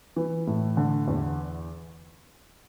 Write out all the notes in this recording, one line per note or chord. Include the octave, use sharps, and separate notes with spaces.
E3
A2
D3
E2